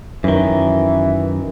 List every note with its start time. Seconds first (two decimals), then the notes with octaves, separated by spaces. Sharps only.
0.24 F#2 D#3 E3